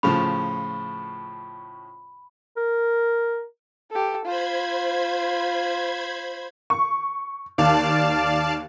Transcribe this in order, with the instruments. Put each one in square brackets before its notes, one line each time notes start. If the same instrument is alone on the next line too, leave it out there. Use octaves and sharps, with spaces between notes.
[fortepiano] A2 C#3 F3 [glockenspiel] B5
[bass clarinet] A#4
[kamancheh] G4 A4
[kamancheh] F4 [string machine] C5 B5 G#6
[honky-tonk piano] C#6
[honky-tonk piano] D#2 [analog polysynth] D5 F5 A5